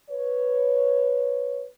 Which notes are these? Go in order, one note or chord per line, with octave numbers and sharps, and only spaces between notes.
B4 C#5